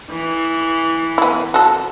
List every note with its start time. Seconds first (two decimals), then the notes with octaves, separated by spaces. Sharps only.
0.11 E3
1.18 B3 E4
1.54 F#4 A4